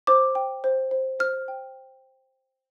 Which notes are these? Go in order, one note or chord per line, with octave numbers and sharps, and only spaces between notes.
C5 D6
G5
C5
C5
C5 F6
G5